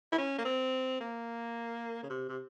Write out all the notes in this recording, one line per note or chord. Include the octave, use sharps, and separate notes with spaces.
E4
C#4
A#3
C4
A#3
C#3
C3
C3